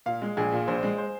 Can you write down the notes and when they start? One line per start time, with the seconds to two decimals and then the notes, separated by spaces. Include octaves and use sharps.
0.06 A#2 F5
0.22 G#3
0.37 A#1 G#4
0.52 A#2
0.68 A#1 C5
0.83 G#3
0.98 C5